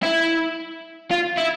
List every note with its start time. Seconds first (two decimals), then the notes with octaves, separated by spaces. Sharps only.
0.03 E4
1.11 F4
1.38 E4